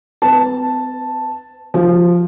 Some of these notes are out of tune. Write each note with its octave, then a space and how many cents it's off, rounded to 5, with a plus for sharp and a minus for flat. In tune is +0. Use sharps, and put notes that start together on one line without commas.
C4 -45 B4 +0 A5 +0
F3 +0 F#4 +45